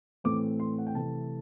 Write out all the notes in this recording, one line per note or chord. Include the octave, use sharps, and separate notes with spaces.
A2 E3 A3 C4 D6
C6
F#5
G5
C3 E3 A3 C4 A5